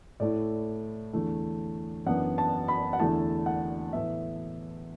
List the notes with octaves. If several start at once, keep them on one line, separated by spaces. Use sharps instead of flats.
A2 A3 E4 D5
E2 D3 A3 E4
F#2 E3 B3 D4 F#5
A5
B5
F#5
E2 D3 A3 E4 A5
F#5
A2 E3 B3 E5